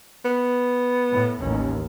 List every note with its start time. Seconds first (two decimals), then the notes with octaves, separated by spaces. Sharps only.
0.25 B3
1.11 A2
1.42 A1 D#2 C#4